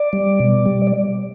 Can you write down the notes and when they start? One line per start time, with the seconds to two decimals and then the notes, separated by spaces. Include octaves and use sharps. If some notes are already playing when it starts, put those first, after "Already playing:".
Already playing: D5
0.13 G3
0.40 B2
0.66 G3
0.87 D5